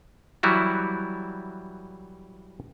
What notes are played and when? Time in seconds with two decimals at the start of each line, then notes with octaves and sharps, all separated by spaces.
0.43 E3 F#3 G3 E4 F#4